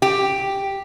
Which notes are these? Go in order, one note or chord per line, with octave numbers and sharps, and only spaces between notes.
G4